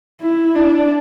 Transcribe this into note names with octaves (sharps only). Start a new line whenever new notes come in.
E4
D4